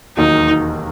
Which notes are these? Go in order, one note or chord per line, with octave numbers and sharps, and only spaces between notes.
E1 D#2 D#3 F#3 A#3 D#4